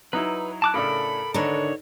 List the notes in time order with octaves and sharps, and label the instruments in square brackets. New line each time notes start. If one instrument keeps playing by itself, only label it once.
[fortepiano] F#3 D#4 E4 [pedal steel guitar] B4
[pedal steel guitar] A5 D6 F#6
[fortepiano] A2 C#3 D4 [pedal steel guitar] A4 A#4 [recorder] B5
[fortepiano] G#2 B4 A#5 [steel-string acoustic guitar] D3 D#3 D4 [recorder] C#5